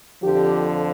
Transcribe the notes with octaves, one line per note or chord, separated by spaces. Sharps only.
F2 D3 F3 G4